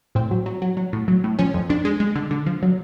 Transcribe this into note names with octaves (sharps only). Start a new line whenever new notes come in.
A2 C4
F#3
F#3
F#3
F#3
A2
F#3
A2
F3 C#4
F2
F2 D4
G#3
G#3
D3
D3
F3
F#3